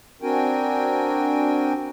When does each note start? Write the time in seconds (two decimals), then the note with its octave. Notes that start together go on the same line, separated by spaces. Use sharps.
0.22 C4 D4 F#4 A#4 G5 G#5